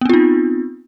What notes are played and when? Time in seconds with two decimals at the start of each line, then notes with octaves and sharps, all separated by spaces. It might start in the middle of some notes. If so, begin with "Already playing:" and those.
0.01 B3
0.05 C4
0.09 F4
0.14 D#4